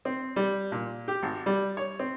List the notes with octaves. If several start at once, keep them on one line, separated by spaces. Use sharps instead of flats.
C4
G3
A#2
G4
G#1
G3
C#5
C4